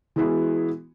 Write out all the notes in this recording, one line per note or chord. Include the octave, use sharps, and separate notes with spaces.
E3 G#3 B3 E4 F#4 G#4